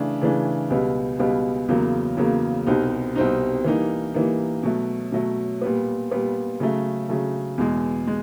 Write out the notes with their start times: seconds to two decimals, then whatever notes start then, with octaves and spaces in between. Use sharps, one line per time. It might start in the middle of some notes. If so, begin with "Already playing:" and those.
Already playing: C#3 E3 A3 D4
0.21 C#3 E3 A3 D4
0.70 C#2 B2 G3 B3
1.19 C#2 B2 G3 B3
1.68 E2 C#3 F#3 A#3
2.17 E2 C#3 F#3 A#3
2.67 C2 B2 G3 C4 D#4
3.16 C2 B2 G3 C4 D#4
3.64 E3 G3 A#3 D#4
4.14 E3 G3 A#3 D#4
4.63 B2 F#3 A3
5.12 B2 F#3 A3
5.62 A#2 G3 B3
6.11 A#2 G3 B3
6.60 C#3 F#3 A3
7.09 C#3 F#3 A3
7.58 E2 B2 G#3
8.07 G#3